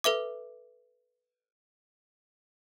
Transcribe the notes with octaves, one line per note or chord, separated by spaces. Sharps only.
A4 B4 E5 D6